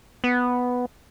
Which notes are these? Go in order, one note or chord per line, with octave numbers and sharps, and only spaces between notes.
B3